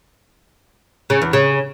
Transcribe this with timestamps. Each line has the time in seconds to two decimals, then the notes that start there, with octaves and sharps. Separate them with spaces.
1.10 C#3
1.22 E2
1.33 C#3